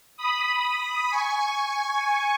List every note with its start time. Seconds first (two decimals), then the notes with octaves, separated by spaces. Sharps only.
0.17 B5 D#6
1.10 G#5 C#6